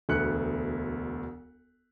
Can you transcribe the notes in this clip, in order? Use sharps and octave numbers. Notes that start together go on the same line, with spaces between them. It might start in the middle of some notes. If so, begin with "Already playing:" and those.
E1 D2 B3 F#6 C#7